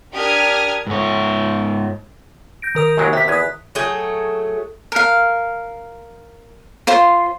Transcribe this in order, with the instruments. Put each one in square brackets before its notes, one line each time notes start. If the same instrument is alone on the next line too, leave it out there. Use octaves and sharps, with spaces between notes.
[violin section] D4 G4 A#4 D#6 F6 G#6
[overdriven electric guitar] G#2 C#5
[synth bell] G6 A#6 D7
D#3 A#4 D#6
[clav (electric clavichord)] D#2 F#3 G#3
[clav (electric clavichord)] C3 [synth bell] E5 B6
[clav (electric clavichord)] E2 G#5 [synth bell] D#6 F#6
[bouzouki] F#3 A3 G#4 G5
[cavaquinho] A#4 F5
F4 C5 C6